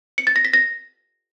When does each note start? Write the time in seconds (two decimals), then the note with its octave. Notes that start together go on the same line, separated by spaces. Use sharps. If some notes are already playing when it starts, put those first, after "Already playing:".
0.18 C#7
0.27 A6
0.36 A#6
0.45 B6
0.53 A#6